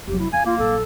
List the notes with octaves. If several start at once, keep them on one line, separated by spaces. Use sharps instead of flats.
F1 F#3 G4
E4
E2 F5 G#5
A#3 F4
A#1 F#3 A4